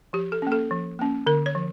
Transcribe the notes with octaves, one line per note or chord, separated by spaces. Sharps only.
F3 G4
A4
A#3 C#4
A4
F3
A#3 C#4
D3 A#4
C#5
F3